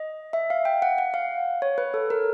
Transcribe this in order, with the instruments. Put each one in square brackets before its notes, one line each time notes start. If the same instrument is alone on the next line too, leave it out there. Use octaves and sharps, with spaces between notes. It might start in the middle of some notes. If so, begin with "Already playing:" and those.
Already playing: [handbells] D#5
E5
F5
G5
F#5
F#5
F5
C#5
B4
A4
A#4